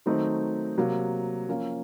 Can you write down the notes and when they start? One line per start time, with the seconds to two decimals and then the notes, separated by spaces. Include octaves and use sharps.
0.06 D#3 F#3 A3 C4 D#4
0.77 C3 F#3 A#3
1.48 F3 A#3 C#4